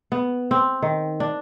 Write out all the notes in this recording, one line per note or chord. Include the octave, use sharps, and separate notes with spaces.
B3
C4
D#3
D4